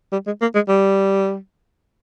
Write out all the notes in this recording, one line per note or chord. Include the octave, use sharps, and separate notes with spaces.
G3
G#3
A#3
G#3
G3